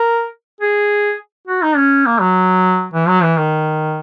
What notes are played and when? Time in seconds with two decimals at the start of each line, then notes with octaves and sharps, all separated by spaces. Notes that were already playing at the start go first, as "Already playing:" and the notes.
Already playing: A#4
0.61 G#4
1.48 F#4
1.62 D#4
1.77 C#4
2.06 A#3
2.21 F#3
2.94 E3
3.08 F#3
3.23 E3
3.38 D#3